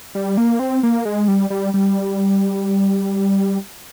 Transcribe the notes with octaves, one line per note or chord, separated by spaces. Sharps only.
G3
A#3
C4
A#3
G#3
G3
G3
G3